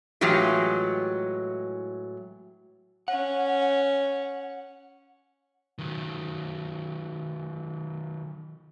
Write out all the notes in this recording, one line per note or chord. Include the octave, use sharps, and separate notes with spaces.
A2 E3 F#3 G#3 F4 G4
C#4 F#5
D#3 F#3